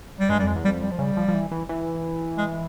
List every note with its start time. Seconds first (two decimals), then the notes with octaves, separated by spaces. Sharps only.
0.20 G3
0.29 G2 G#3
0.39 G3
0.42 F2
0.47 G#3
0.56 E2
0.65 G3
0.68 F2
0.82 G3
0.91 F3
0.99 C#3 G3
1.17 F3
1.28 F3
1.34 E3
1.51 E3
1.69 E3
2.38 G#3